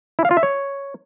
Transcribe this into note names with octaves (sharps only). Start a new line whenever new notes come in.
E4
F5
F4
E5
C#5